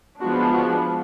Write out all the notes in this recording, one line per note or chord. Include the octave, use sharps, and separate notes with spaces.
F3 G#3 B3 D4 F#4
F#4